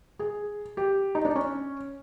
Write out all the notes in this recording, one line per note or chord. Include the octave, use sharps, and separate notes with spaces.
G#4
G4
D#4
D4
C#4